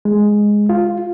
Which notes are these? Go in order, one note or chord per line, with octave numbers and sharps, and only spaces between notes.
G#3
F4